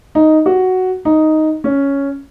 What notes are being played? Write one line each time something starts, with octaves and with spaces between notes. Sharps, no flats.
D#4
F#4
D#4
C#4